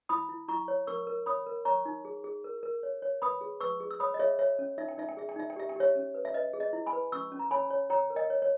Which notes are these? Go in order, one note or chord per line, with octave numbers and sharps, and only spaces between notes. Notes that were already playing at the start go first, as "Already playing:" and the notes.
E4 B5 D#6
E4
E4 A#5 C#6
C#5
A#4 C#6 E6
A#4
C#5 B5 D#6
A#4
C#5 A#5 C#6
D#4
G#4
G#4
A#4
A#4
C#5
C#5
B4 B5 D#6
G#4
B4 C#6 E6
G#4
E6
C#5 B5 D#6
D#5
G#4 C#5 E5
C#5 E5
C#4
D#4 E5
G5
D#4 E5
G5
G#4 E5
G5
D#4 E5
G5
G4 E5
G5
G4 C#5 E5
C#4
B4
E5
B4 D#5
G#4
D#5
E4
G#5 B5
B4
C#4 C#6 E6
C#4
A#5
C#5 G#5 B5
C#5
C#5 G5 A#5
A#4
D#5 G5
C#5
C#5